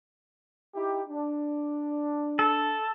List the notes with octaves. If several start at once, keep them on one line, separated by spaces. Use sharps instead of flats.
D#4 E4 G4
D4
A4